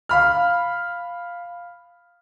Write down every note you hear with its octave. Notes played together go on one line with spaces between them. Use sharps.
F5 B5 F6